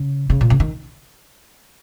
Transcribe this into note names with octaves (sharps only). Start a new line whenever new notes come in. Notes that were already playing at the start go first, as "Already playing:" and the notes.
Already playing: C#3
C#3
A#2
C#3
D#3